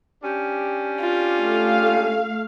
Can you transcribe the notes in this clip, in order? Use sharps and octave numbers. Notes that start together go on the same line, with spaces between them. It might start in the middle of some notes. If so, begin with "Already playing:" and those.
C#4 D4 G4
F4
A3 F5